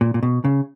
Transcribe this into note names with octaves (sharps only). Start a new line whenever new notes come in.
A#2
A#2
B2
C#3